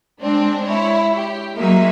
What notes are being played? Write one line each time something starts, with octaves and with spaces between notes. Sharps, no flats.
G#3 C4 D4
E4 C#5
G4
F#3 G#3 A#3 D#4 E5